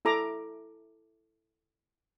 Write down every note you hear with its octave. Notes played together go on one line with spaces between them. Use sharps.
E4 A4 A#5 D6